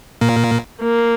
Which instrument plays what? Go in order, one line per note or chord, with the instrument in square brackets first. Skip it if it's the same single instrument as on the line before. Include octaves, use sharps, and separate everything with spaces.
[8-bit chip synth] A#2 A#3
[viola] A#3